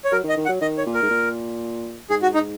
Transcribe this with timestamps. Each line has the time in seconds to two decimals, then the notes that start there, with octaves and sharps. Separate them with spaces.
0.05 C#5
0.12 F#3 A#4
0.24 D#3
0.29 D#5
0.37 D#3
0.46 F#5
0.49 F#3
0.62 D#3 D#5
0.78 C#5
0.87 A#2
0.94 A#4
1.02 G#2
1.11 A#2
2.10 G#2 G#4
2.22 F#4
2.34 D#4